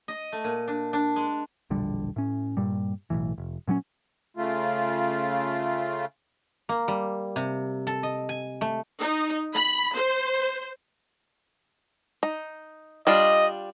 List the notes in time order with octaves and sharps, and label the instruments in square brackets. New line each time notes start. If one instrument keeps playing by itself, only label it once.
[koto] D#5
A3
A#2
D4
D4
G#3
[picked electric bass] E1 A#1 D3 G3
A2 C#4
G2 A#2 G3
B1 F#2 A2 E3
F1
A#2 F#3 G3 C#4
[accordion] C#3 A3 F4
[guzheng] A#3
G3
C3
A4
D#5
G#5
A3
[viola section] D#4
B5
C5
[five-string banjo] D#4
[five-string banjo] G3 D4 F4 [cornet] D#5